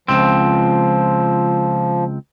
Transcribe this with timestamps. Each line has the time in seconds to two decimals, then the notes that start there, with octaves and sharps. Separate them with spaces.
0.08 C#2 F3 C4